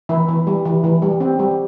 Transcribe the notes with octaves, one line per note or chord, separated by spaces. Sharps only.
E3 E4
E3
G3
E3
E3
G3
C4
G3